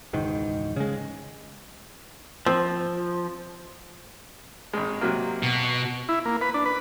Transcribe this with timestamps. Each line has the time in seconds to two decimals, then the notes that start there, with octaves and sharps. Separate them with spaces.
0.13 E1 C#2 G#2 D#3
0.76 C#3 G#3
2.46 F3 C4
4.73 G#1 G#3
5.01 C3 F#3 A#3
5.43 B2
6.09 E4
6.25 A#3
6.41 B4
6.54 D4
6.66 B4